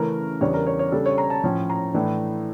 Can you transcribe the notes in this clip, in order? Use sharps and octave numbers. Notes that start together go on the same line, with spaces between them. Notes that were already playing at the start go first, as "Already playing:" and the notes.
Already playing: C#3 E3 A3 C#4 A#4
E2 C#3 G3 D4 C#5
A#4
C#5
C#5
C#3 G3 D4 A4
C#5
A#5
A5
A2 F3 C#4
A#5
A2 E3 A3 D4